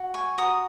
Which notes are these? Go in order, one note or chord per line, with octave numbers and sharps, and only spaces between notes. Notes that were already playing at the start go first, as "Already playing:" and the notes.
Already playing: F#4
G#5 C#6
F#4 A#5 D#6